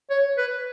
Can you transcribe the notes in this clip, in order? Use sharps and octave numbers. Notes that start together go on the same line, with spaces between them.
C#5
B4